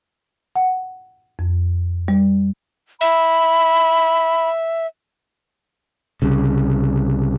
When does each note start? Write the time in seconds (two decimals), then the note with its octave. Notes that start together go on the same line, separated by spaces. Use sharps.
0.56 F#5
1.39 F2
2.08 G3
3.01 E5 B5
6.22 C2 C#3